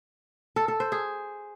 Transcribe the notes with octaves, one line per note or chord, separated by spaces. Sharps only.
A4
A4
C5
G#4